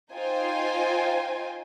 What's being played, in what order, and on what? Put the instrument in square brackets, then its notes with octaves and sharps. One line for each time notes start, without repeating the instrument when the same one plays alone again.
[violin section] D#4 F4 C5 G5 G#5